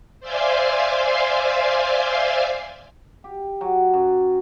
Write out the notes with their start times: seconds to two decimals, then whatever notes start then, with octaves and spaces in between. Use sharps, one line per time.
0.21 C5 D5 E5 F5 G#5 C6
3.24 G4
3.61 F#3
3.94 F#2